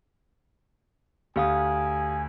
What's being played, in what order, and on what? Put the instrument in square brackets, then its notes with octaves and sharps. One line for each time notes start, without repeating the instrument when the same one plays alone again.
[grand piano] D2 [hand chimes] G4 F5 D#6 [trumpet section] G#5